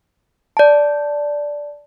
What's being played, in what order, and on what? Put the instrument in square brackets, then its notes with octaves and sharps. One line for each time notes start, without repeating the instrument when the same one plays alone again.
[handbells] D5 A5